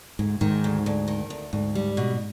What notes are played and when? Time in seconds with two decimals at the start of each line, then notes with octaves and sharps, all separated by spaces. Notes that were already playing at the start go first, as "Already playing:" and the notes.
0.19 D2 G#2
0.41 G#2 D#3
0.64 D2
0.86 D2
1.08 D#3
1.30 D2
1.53 D2 G#2
1.75 G3
1.97 B2